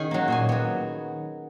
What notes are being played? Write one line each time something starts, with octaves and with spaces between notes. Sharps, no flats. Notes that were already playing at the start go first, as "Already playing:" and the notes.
Already playing: D#3 C#4 G#4 G#5
F#3 A#3
A#2 G#4 G#5
F#3 B3